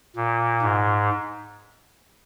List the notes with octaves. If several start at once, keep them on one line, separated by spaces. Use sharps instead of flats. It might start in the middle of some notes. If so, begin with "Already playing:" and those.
A#2
G#2